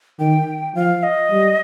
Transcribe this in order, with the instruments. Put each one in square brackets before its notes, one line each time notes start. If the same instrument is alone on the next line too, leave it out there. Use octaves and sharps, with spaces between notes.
[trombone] D#3 [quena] G5
[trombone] F3 [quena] F5
[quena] D#5
[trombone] G3